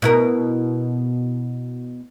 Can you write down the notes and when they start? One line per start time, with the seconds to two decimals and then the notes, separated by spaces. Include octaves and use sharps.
0.02 B2 E4 A#4